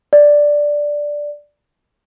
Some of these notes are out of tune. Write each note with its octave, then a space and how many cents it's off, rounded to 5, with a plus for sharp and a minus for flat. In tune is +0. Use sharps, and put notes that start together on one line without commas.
D5 +0